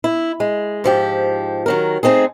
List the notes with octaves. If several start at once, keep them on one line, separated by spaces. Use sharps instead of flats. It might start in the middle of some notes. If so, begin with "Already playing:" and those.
E4
G#3
G#2 F3 G4
D#3 F#3 A#4
A3 C4 D#4 G#4